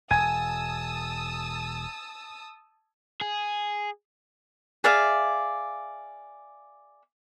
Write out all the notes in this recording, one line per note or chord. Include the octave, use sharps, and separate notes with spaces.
E1 G#5 A5 D#6 E6 G#6 D#7
G#4
G#4 D5 E5 F5